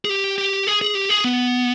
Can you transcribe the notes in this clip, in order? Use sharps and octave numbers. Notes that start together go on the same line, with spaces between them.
G#4
G4
G4
G#4
G#4
G4
G#4
B3